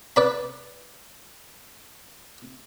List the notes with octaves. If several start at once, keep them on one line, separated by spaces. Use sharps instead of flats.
B4 D5 B5